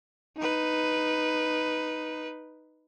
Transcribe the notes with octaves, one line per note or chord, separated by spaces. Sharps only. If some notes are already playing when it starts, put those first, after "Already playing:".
D#4 B4